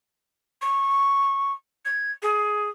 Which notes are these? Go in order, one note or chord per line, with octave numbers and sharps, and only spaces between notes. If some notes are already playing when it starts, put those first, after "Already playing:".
C#6
G#6
G#4